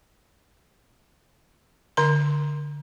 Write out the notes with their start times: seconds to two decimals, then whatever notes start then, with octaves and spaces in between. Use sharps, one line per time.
1.97 D3 C6